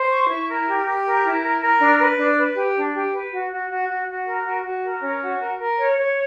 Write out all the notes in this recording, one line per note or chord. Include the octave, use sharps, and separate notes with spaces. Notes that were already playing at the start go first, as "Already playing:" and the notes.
Already playing: C5
C#6
E4
A#4
G4
G4
A#4
E4
A#4
A#4
D4
B4
D4
B4
G4
D4
G4
B4
F#4
F#4
F#4
F#4
F#4
A#4
F#4
F#4
A#4
C#4
F#4
A#4
A#4
C#5
C#5